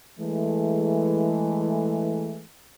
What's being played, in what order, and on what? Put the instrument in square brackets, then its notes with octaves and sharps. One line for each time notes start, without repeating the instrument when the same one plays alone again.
[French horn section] E3 G#3 A3